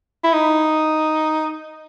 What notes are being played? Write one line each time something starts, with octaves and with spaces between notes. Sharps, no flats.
E4
D#4